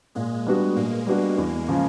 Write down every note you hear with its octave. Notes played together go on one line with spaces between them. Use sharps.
A#2 G#3
G3 B3 D4 F#4
A#2 A#3
G3 B3 D4 F#4
E2
C#3 F3